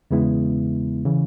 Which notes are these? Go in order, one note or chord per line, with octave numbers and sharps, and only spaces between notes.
E2 C#3 G#3 B3 E4
C#3 E3